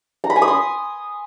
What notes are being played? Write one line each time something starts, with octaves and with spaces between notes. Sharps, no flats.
A#5
B5
G#5
D#6
C6